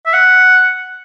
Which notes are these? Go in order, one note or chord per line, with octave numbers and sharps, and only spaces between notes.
E5
F#5